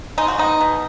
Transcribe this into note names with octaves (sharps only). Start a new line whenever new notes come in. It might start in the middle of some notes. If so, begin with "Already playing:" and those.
G#3 D#4
F#4
B3 D#4
B2